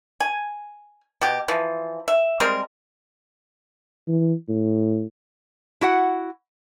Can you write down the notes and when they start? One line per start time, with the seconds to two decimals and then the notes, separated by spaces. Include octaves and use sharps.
0.20 G#5
1.21 B2 G4
1.48 E3 F3
2.08 E5
2.40 G3 G#3 C4 A#4
4.08 E3
4.49 A2
5.81 E4 F#4 F#5